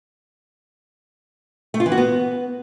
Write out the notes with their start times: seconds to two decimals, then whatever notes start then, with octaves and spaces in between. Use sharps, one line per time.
1.74 A3
1.80 F4
1.86 E3
1.92 F#4
1.98 B3